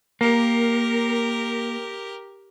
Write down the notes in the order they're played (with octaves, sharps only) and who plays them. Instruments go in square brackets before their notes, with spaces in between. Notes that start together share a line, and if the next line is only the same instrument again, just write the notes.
[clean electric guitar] A#3 [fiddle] G4 A#4